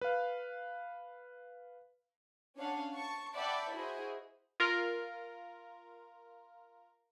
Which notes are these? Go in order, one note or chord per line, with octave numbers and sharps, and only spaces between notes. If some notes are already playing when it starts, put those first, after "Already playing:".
B4 F5
C#4 D4 C#5 F5 F#5
A5 C#6
D5 E5 F#5 G5 A5 B5
E4 F#4 G#4 C5 D#5
F4 A#4